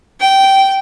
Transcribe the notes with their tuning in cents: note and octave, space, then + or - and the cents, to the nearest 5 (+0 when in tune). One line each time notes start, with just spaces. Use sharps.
G5 -15